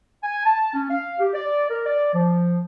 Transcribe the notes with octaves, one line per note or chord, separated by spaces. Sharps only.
G#5
A5
C#4
F5
G4
D5
A#4
D5
F3